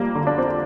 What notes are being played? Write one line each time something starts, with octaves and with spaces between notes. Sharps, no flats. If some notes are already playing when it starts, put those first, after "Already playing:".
Already playing: F2 G3 A#3
D3
D4
F2 C4